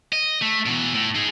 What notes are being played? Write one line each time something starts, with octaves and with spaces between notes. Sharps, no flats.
D#5
A3
B2 E3
A2
D#4 G#4